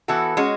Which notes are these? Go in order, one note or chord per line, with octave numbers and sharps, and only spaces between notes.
E3 B3 F#4 A4
G#3 C#4 F#4